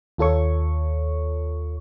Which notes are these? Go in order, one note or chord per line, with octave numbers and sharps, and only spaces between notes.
D#2 F4 A4 C#5 C#6